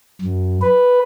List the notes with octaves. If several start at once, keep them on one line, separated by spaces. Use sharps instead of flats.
F#2
B4